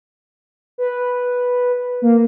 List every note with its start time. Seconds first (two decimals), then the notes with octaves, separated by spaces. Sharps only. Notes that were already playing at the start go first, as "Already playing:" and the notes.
0.78 B4
2.02 A#3